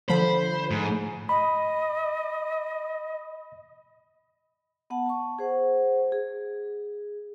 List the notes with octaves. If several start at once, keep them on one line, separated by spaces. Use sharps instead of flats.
D3 F3 C5 B5
G#2
D#5 B5
B3 F#5 A5
A5 C#6
G#4 C5 F#5
G#4